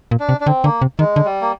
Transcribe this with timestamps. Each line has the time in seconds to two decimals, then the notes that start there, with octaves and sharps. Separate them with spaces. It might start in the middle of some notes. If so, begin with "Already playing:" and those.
0.11 A#2
0.20 D4
0.29 C3
0.41 D4
0.46 D3 C4
0.64 D3 A#3
0.82 C3
0.99 D#3 G#3
1.16 D3
1.26 G3
1.41 A#3